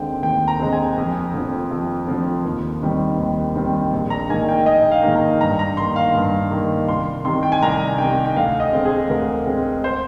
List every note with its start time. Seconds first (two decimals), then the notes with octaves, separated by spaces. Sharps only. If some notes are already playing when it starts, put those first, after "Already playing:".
Already playing: D#2 D3 G#3 C4 G5
0.23 D#2 G5
0.48 A#5
0.60 D3 G#3 C4
0.73 G#5
0.97 F2
1.34 D3 F3 C4
1.71 F2
2.07 D3 F3 C4
2.45 D#2
2.82 D#3 G3 C4
3.18 D#2
3.56 D#3 G3 C4
3.93 A#1
4.10 A#5
4.29 G#2 D#3 A#3 G#5
4.49 G5
4.66 A#1 D#5
4.83 G5
4.91 F5
5.03 G#2 D#3 A#3
5.15 A#5
5.40 G2 A#5
5.59 A#5
5.77 D#3 A#3 C6
5.96 F5
6.15 G2
6.51 D#3 A#3
6.87 C2 C6
7.25 C3 D#3 C6
7.43 G5
7.52 G#5
7.62 C2 A#5
7.98 C3 D#3 G5
8.25 G5
8.36 D2 F5
8.60 D#5
8.73 D3 G#3 C4
8.85 G#4
9.10 D2 A#4
9.47 D3 G#3 C4
9.84 C5